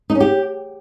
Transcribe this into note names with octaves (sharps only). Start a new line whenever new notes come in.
D#4
C#4
G4